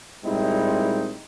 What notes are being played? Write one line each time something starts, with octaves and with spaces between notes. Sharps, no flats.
A#2 G3 G#3 C4 D#4 E4